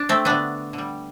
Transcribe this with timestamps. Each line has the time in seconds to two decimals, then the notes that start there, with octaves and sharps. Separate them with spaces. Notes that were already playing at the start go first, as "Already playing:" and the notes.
Already playing: D4
0.09 A3 C4
0.25 D3 A3 B3 D4
0.73 D3
0.78 G3